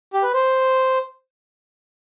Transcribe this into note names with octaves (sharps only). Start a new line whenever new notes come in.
G4
B4
C5